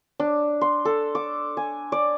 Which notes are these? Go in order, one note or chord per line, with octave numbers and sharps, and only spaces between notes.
D4
C6
A4
D6
G#5
D5